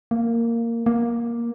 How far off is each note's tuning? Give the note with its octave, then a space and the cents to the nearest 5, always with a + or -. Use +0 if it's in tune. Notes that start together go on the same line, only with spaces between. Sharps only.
A#3 -10
A#3 +10